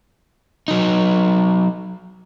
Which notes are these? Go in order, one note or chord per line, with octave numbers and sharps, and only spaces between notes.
F#3 D#4